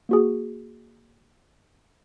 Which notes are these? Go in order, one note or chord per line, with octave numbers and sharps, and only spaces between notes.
A#3 F#4 G#4